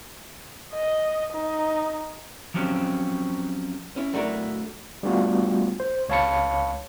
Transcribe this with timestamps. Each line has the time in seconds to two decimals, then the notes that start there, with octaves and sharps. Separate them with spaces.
0.73 D#5
1.33 D#4
2.54 F3 F#3 C4 C#4 G4
3.96 C#4 E4
4.14 F#3 A3 D4 E4 A#4
5.03 G3 A3 B3 D4 F4 F#4
5.80 C5
6.09 C#2 C#5 F5 A5 B5 C#7